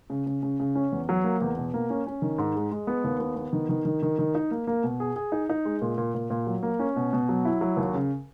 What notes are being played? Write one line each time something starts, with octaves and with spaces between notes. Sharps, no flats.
C#3
C#3
C#3
C#3
C#4
E2
F#3
A#3
E2
B2
A#3
C#4
C#4
D#3
G#2
G#3
G#3
B3
D#2
B3
B3
D#3
D#3
D#3
D#3
D#3
D#4
A#3
A#3
B2
G#4
G#4
D#4
D#4
G#3
A#2
A#2
A#2
A#2
F#3
A#3
C#4
B2
B2
F#3
E4
F#3
D#2
C#3